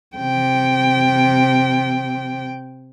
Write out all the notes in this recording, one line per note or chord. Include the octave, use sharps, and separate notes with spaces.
C3 G5